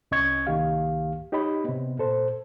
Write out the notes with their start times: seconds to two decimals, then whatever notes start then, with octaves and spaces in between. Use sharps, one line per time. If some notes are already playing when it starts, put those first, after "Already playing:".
0.11 C2 C#4 D#5 C#6 G#6
0.47 C2 D#3 A#3 G4 F5
1.32 D#4 G4 C#5 D#5 B5
1.64 C3 B3
1.99 A#2 A4 C5